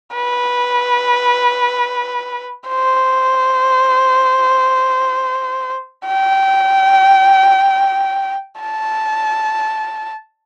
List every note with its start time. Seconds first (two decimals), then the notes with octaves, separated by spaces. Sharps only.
0.15 B4
2.69 C5
6.06 G5
8.60 A5